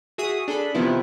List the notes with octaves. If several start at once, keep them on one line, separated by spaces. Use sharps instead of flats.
F#4 G#4 E5 D#6
D4 G#4 A4 B5
C3 D#3 F3 B3 E4